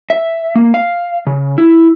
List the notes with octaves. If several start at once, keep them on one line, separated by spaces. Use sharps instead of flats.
E5
A#3
F5
C#3
E4